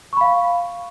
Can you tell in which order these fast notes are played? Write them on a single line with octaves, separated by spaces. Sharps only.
C#6 B5 F5